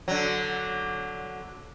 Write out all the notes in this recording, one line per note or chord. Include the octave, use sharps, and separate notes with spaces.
D3 F#3